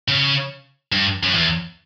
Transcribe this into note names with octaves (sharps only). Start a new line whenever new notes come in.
C#3
G2
F#2
E2